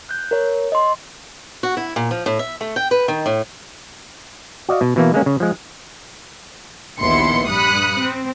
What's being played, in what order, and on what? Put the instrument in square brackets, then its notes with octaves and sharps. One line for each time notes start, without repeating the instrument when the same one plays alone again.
[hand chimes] F#6 G6
A#4 C#5
D#5 C6
[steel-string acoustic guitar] F#4
E4
A#2
F3
A2
E5
A3
G5
B4
D#3
A2
[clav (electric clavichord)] F#4 D5 D#5 F5
B2
B2 E3 A#3
G#3 A#3 C#4
C#3
F3 G#3
[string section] A#1 D#2 B3 E4 C6 C#7
G2 B5 D#6 F#6 C#7
C4